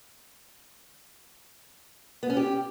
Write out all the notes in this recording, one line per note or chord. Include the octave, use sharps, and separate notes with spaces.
B3
C#4
G4